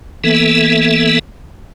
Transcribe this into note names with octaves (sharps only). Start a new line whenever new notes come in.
E3 A#3 B3 A4 E5